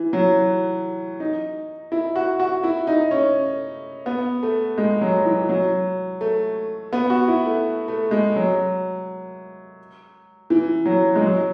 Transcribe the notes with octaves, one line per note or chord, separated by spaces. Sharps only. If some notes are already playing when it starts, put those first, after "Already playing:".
Already playing: E3
F#3
D#4
E4
F#4
F#4
E4
D#4
C#4
B3
A3
G#3
F#3
E3
F#3
A3
B3
F#4
E4
A3
A3
G#3
F#3
E3
F#3
G#3
F#3